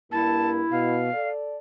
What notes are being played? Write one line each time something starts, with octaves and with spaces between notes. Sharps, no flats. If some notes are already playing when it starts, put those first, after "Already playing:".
G2 A#3 E4 A5
B2 F5
A4 D5